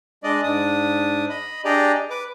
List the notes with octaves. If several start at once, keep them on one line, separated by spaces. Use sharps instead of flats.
G#3 D4 D5 D#5
G#2 D4 D#6
D#5 B5
D4 G4 G#4 D5 D#5 A#5
B4 D6